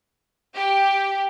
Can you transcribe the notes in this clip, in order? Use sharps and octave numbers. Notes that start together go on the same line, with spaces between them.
G4